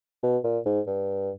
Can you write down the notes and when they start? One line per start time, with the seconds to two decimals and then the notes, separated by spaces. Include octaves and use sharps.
0.23 B2
0.44 A#2
0.66 G#2
0.87 G2